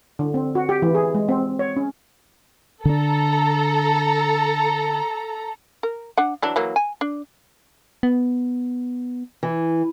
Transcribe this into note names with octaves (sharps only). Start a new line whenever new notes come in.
D3
C4
F#4
G4
E3
G#4
G#3
C4
C#5
C#4
D3 D4 A4 A#5
A#4
D4 F#5
E3 F#3 D4
E3 F#3 A#3
G#5
D4
B3
E3